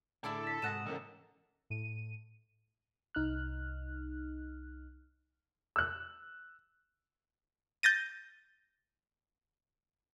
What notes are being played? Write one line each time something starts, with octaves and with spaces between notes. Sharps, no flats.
A2 D3 E4 G#4 A4 D5 A5
B6
G#2 C3 F#4 D#5 F#5 A#6 E7
C#3 E3 D#4 A4 A#4
A2 D#7
C2 D#4 F6 F#6
E6 F#6
G6 A6 A#6 D#7